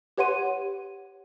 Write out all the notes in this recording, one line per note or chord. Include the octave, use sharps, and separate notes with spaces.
G4 B4 C#5 F#5 C6 D#7